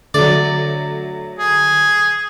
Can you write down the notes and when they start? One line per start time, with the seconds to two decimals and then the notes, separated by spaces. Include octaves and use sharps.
0.14 D3 F#3 A3 D5
1.39 G#4